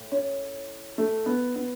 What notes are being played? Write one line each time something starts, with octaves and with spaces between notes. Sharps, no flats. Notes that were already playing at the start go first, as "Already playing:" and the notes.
Already playing: A2
C#4
A3
B3
B3